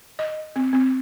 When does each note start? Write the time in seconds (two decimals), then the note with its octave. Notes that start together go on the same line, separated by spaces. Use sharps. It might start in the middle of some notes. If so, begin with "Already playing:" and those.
0.19 D#5
0.56 C4
0.73 C4